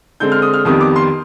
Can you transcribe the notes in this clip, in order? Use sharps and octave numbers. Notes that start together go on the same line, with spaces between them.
D3 G#3 C4 G6
F6
D#6
F6
F2 D#3 G3 B3 D#6
D6
C6